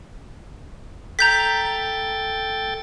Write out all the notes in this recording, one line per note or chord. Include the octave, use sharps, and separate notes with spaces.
A4 G5 A#5 G6 A6 B6